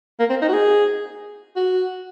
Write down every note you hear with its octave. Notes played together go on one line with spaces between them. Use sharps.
A#3
C4
D#4
F#4
G#4
F#4